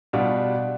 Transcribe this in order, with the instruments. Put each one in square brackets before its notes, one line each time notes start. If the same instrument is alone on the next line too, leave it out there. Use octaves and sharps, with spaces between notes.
[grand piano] B2 G3 D4 F4